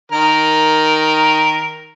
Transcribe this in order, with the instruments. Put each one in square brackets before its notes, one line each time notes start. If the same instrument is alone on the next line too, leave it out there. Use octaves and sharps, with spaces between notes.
[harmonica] D#3 A#4